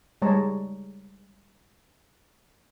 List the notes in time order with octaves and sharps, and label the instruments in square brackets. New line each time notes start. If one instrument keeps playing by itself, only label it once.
[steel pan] G3 G#3 C#5 A5 A#5